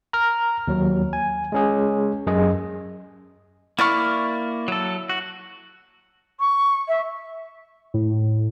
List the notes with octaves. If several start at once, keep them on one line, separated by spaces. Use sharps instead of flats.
A#5 F6
D#2 F#3
G#5
G#3 C#4 G#4
F#2 G#4 D#5
A#3 E4 D5 C#6 F6
F#3 A4
F#4
C#6
E5
A2